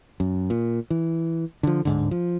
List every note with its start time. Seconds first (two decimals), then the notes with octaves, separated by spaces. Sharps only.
0.20 F#2
0.50 A#2
0.90 E3
1.63 D3 F3
1.85 D1 G#2 D3
2.11 F3